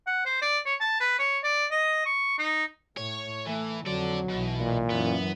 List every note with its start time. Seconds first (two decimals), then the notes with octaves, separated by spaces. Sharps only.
0.07 F#5
0.25 C5
0.42 D5
0.66 C#5
0.80 A5
1.00 B4
1.19 C#5
1.44 D5
1.71 D#5
2.06 C#6
2.39 D#4
2.97 A2 C#5
3.46 E3 A3
3.86 F2 D3 F#3 A4 D5
4.30 B1 B2 E3
4.60 A#2
4.90 F#2 E3 B3